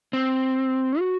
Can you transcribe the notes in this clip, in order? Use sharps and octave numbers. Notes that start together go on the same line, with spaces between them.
C4
F#4